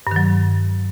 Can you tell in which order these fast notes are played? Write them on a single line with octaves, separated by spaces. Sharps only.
G2 D#3 F#3